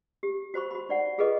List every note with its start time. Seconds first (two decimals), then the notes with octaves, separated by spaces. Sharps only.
0.23 G4
0.54 F#4 C5 B5 C#6
0.71 F#4 B5
0.89 D#4 D5 F#5
1.18 F4 G#4 A4 B4 D#5 C#6